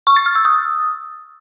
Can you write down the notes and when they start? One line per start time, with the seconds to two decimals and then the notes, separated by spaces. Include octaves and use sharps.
0.07 C#6
0.16 A6
0.26 F6
0.36 E6
0.45 D#6